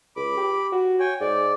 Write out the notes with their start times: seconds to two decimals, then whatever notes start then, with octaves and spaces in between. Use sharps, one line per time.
0.16 C#2 B5 D6
0.37 G4
0.72 F#4
1.00 C#5 G5 G#5
1.20 G#2 D5